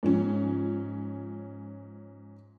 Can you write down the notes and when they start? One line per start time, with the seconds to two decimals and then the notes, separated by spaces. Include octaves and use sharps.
0.03 G#2 F3 C#4